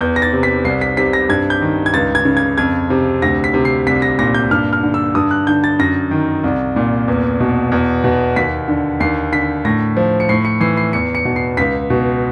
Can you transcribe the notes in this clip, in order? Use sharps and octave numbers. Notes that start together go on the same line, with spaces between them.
E2 G6
A#6
A6
C3
B6
C2 C7
B6
C3 B6
A#6
G2 G#6
G6
D#3
G#6
C#2 A6
G#6
C#3
G#6
F2 G#6
C3
D2 A#6
B6
C3
C7
C2 B6
A#6
A#2 A#6
G6
G2 F6
F6
D3
E6
G2 D#6
F#6
D3 G6
A6
F#2 A#6
D#3
C2
A#2
E2
B2
E2
B2
D#2 B6
D3
D#2 C7
D3 B6
A2 A#6
F3
C#7
A2 C7
C#7
E3 C7
C7
E2 C#7
C#7
B2
C7
C#2 B6
B2